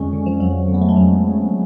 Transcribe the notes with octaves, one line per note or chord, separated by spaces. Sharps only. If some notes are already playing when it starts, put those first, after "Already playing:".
Already playing: F2 D3 G#3 C#4
D3
F3
F2 F#3
D3
B3
A3
G#3
F2 F#3